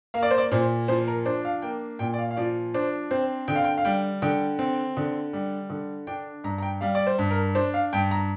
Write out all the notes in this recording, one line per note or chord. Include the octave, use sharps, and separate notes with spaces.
A#3 F5
D5
C5
D5
A#2 C5
F3 C5
A#4
D4 C5
F5
A#3 G5
A#2 G5
D5
F5
F5
F3 D5
D4 C5
C4 C5
D3 G5
F5
G5
F5
G3 G5
D3 G5
C4
D3
G3
D3
D4 G5
G2 A#5
A#5
G5
G3 F5
D5
C5
G2
A#4
D4 C5
F5
G2 G5
A#5